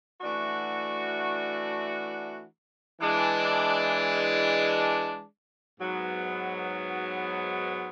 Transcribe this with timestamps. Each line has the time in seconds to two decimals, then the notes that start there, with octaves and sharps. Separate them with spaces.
0.21 E3 A3 D4 F#4
3.00 E3 G#3 D4
5.79 G#2 F#3 B3